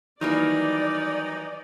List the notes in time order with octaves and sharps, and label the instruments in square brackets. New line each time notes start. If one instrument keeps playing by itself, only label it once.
[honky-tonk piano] D#3 E3 [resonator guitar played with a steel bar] F#3 G3 A#3 [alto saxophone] D#4 [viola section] D5